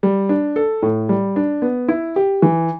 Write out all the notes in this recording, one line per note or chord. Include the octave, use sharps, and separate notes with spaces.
G3
D4
A4
A2
G3
D4
B3
E4
G4
E3